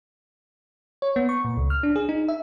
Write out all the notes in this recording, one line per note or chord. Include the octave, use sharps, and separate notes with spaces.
C#5
B3
C#6
A#2
C#2
F6
D4
G#4
D#4
E5